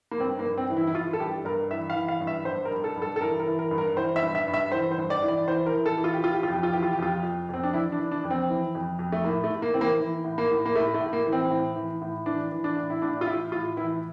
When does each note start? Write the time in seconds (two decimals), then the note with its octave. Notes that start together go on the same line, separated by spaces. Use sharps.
0.11 A#3
0.19 G2 C4
0.39 A#3
0.45 G2
0.57 C4
0.70 E3
0.77 E4
0.87 E4
0.95 E3 F4
1.13 A4
1.20 G2 G4
1.45 G2 A#4
1.71 E3 E5
1.90 F5
1.95 E3
2.08 F5
2.20 G2
2.27 E5
2.45 G2 C5
2.65 A#4
2.71 G2
2.84 A4
2.96 G2
3.02 A4
3.16 A4
3.21 E3 A#4
3.40 A#4
3.47 E3
3.59 A#4
3.71 G2
3.78 A#4
3.97 E3 C5
4.16 E5
4.22 G2
4.35 E5
4.47 G2
4.54 E5
4.72 E3 C5
4.92 C5
4.98 G2
5.10 D5
5.23 E3
5.28 D5
5.48 E3 C5
5.66 A#4
5.72 E3
5.86 A4
5.98 E3
6.04 F4
6.14 G4
6.23 E3 F4
6.34 G4
6.43 F4
6.48 F2 G4
6.63 F4
6.73 E3 G4
6.83 F4
6.93 G4
6.98 F2 F4
7.23 F2
7.49 F2 C4
7.63 D4
7.74 E3 E4
7.92 D4
8.00 E3
8.11 D4
8.24 F2
8.30 C4
8.49 E3
8.75 F2
8.99 F2
9.12 A3
9.24 A2 A#3
9.44 A3
9.50 A2
9.62 A#3
9.74 E3 C4
9.81 A#3
10.00 E3
10.25 A2
10.38 A#3
10.50 A2
10.66 A#3
10.76 A2 A3
10.94 A3
11.01 A2
11.13 A#3
11.26 E3
11.32 C4
11.51 A2
11.76 E3
12.02 A2
12.26 E3 D4
12.52 E3
12.64 D4
12.77 A2
12.90 E4
13.02 A2 D4
13.21 F4
13.27 E3 E4
13.52 A2 F4
13.77 E3 E4